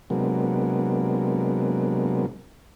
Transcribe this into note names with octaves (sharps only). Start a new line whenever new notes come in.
C3 F#3 G#3 A#3 B3 D4